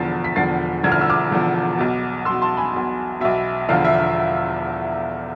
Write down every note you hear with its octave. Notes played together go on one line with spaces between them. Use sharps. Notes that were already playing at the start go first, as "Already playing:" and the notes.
Already playing: E1 E2 D3 F3 A6 C7
B6
E1 E2 D3 F3 A6 C7
E1 E2 D3 F3 G#6
F6
E6
D6 F6
E1 E2 D3 F3
B1 B2
B1 B2 C6 E6
A5 C6
G#5 B5
B1 B2
B1 B2 E5
E1 E2 D3 F3 F5
E5